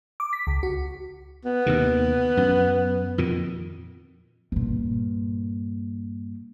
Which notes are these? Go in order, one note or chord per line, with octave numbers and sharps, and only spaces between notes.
D6
B6
C#2
F#4
B3
D#2 C3 D#3
F#2
F2 A#2 D#3
G2 A#2